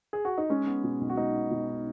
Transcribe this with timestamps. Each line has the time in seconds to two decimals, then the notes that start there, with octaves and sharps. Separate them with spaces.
0.13 G#4
0.25 F#4
0.38 D#4
0.50 G#3 C#4
0.67 B3
0.84 B2
1.01 B1
1.10 F#4
1.17 G#3 D#4
1.35 B3
1.51 B2